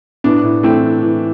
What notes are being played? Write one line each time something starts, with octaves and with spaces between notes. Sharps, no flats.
A2 B3 D4
A2
E3 A3 C4
E3
E3